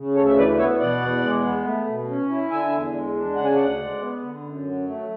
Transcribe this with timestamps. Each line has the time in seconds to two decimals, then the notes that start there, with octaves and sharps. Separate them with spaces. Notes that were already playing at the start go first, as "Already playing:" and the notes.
Already playing: C#3
0.15 D2 A4 C#5
0.26 E5
0.36 E3 B4 D5
0.58 B3 C#5 E5
0.79 B2 D5 F#5
1.01 E2
1.23 G#3
1.43 B3
1.64 A3
1.87 B2
2.08 C#4
2.29 E4
2.50 D3 E5 G#5
2.72 E2
2.93 G#3
3.14 D4
3.35 C#3 F#5
3.45 G#5
3.55 D2 D5 F#5
3.79 G#3
4.01 B3
4.22 D3
4.43 F#2
4.64 F#3
4.86 A3